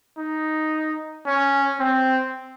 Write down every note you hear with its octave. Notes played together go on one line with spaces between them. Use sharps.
D#4
C#4
C4